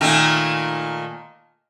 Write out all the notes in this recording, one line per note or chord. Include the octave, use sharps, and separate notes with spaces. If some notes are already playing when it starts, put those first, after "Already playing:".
A#2 D#3 A3